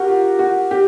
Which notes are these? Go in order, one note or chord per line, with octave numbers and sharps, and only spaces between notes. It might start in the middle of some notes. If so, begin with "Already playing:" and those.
Already playing: F#4 G4 A#4
F4
F#4
G4